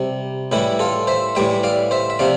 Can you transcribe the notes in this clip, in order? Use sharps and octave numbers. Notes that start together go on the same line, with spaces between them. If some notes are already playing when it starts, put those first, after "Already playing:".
Already playing: C3 G3
A2 E3 G3 E4 G4
F4 A4
C5 E5
A2 E3 G3 E5 G5
D5 F5
C5 E5
E5
C3 F3 D5 F5